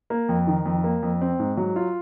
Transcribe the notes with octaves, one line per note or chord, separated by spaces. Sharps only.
A#3
F2
D#3
F2
A#3
F2
C4
G#2
F#3
F4